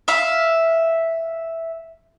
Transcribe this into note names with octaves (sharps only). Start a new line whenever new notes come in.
E5 F5